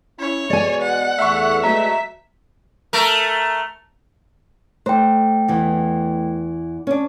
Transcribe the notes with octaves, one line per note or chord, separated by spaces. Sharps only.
C#4 E4 C#5
B2 G#3 D5 G#5
F#5
E2 A3 E5 C#6
B2 F#3 G#3 A3 E5
A3 A#4
A3 C5 G5
E2 E3
C#4 D4